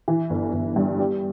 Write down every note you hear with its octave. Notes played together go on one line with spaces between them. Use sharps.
E3
G1
G1
G2
G3